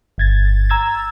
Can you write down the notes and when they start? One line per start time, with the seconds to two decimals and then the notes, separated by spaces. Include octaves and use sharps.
0.18 G1 G#6 A6
0.69 A#5 E6 G#6 A6